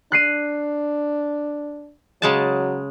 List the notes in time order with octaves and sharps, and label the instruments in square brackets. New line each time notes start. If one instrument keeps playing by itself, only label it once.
[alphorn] D4 [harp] F#6 C7 D#7
[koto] C#3 G#3 A5 [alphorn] F#3